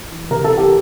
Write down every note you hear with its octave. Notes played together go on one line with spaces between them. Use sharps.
E3
C3 A#4
A4
E3
G4